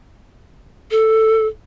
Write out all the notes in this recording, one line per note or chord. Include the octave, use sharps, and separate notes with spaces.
A4